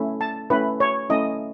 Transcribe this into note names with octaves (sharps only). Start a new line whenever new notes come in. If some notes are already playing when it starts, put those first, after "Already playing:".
Already playing: A3 C#4 E4
A5
A3 C#4 E4 B4
C#5
A3 C#4 E4 D#5